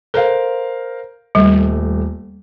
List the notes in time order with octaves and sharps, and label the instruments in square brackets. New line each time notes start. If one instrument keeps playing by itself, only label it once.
[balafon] A4 [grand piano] A#4 C5 F5
[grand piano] D#1 A3 [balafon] G3